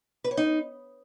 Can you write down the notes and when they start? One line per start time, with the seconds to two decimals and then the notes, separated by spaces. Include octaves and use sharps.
0.24 B4
0.31 C#5
0.37 D#4